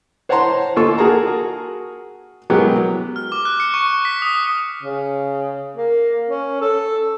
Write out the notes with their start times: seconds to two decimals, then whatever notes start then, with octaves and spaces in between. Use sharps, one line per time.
0.29 C5 C#5 F#5 A5 A#5 C6
0.76 D#2 F4 A4 C#6
0.98 F#4 G#4 A#4 A5 A#5
2.50 F#3 G#3 B3 G4 A#4
3.16 F6
3.32 D6
3.45 F#6
3.60 C#7
3.74 C#6
4.05 B6
4.22 D#6
4.83 C#3
5.77 A#3
6.29 C#4
6.62 A4